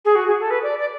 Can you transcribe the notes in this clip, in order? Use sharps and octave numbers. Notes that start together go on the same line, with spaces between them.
G#4
F#4
G#4
A4
B4
D5
D5